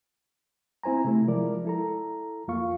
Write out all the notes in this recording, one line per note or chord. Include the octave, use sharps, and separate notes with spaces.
C4 E4 C5 G#5 A#5
C3 A3 E4
F3 G#3 E4 A#4 D5
E4 A4 A#5
F2 A#3 F4 F5 C#6